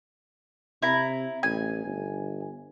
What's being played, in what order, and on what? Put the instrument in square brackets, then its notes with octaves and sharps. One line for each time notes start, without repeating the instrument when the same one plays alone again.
[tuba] C3 [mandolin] E4 A#5
[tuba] A1 [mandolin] G#5
[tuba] G1